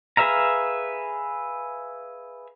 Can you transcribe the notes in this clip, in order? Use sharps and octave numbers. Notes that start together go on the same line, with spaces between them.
G#4 B4 E5 F5 A#5